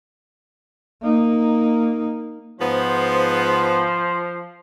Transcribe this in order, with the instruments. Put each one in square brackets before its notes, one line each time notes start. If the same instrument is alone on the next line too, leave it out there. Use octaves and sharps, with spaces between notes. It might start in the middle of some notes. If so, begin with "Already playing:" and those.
[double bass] A#3 D#4
[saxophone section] G#2 B3 [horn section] F3 C5